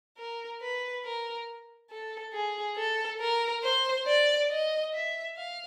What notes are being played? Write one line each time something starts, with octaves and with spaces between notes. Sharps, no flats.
A#4
B4
A#4
A4
G#4
A4
A#4
C5
D5
D#5
E5
F5